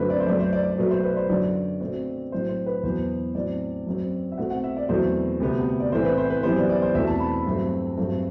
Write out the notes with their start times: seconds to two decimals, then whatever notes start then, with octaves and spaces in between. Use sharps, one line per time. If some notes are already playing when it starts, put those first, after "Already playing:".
Already playing: F#2 D3 F#3 A3 C4 B4 C5
0.10 D5
0.20 C5
0.26 F#2 F#3 A3 D5
0.40 C5
0.53 D5
0.65 D5
0.78 B2 F#3 A3 B4
0.91 C5
1.03 B4
1.12 D5
1.17 C5
1.29 F#2 D3 F#3 D5
1.81 B2 A3 C4
2.32 A2 F#3 C4 C5
2.49 C5
2.66 B4
2.83 E2 B2 F#3 B3 C5
3.35 A2 F#3 C4 D5
3.87 F#2 F#3 C4
4.32 E5
4.37 B2 A3 C4 F#5
4.50 F#5
4.64 E5
4.77 D5
4.89 E2 B2 F#3 A3 C4 C5
5.40 D2 C3 G3 B3
5.80 D5
5.92 A2 E3 A3 C4 C5
6.04 B4
6.18 C5
6.30 B4
6.43 F#2 E3 G3 B3 C5
6.56 D5
6.69 D5
6.82 C5
6.95 E2 B2 A3 C4 E5
7.07 A5
7.20 B5
7.46 G2 F#3 A3 C4
7.97 G2 F#3 A3 C4